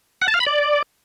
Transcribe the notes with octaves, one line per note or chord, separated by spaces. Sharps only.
F#5
A5
F5
B5
D5